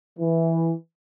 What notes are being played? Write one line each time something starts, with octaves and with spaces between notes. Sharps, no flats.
E3